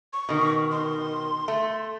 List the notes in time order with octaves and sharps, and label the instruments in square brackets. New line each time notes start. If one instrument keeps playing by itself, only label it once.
[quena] C#6
[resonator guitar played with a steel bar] B2 D#3
[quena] C6
[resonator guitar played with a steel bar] A3